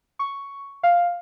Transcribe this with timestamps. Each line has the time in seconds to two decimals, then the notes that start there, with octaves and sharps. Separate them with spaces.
0.19 C#6
0.83 F5